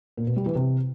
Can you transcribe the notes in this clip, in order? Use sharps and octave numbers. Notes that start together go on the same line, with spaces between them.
A#2
B2
G3
E3
C3